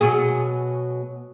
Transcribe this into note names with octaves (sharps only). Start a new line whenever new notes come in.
B2 F#3 G#4